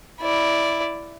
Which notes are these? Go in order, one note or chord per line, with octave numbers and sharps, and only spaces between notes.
E4 D5